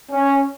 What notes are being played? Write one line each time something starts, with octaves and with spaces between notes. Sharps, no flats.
C#4